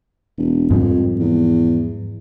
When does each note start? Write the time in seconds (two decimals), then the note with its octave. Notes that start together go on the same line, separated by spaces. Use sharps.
0.38 E1
0.70 F2 G#2 F3 G3
1.20 E2